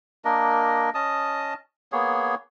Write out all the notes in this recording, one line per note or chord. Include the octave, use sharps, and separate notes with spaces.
A#3 D4 A#4 D#5
C#4 D#5 A5 D#6
A#3 B3 G#4 C#5